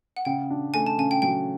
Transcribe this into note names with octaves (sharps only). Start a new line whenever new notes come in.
F#5
C#3 G5
D4
A3 G#5
A5
C#3 G#5
G5
F#3 G5